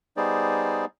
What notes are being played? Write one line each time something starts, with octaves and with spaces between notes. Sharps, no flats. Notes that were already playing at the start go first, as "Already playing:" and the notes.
G3 B3 D#4 G#4 C5 D5